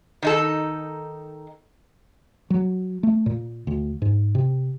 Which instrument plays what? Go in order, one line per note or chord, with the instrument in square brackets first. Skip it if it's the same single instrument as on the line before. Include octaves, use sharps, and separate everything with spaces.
[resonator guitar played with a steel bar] D#3 D#4 A4
[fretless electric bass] F#3
A3
A#2
D2
G#2
C3